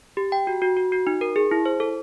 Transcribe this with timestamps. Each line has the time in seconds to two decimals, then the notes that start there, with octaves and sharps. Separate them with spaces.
0.17 G4
0.32 G5
0.47 F#4
0.62 F#4
0.77 F#4
0.92 F#4
1.07 D#4
1.21 A#4
1.36 G#4
1.51 E4
1.66 C5
1.80 A4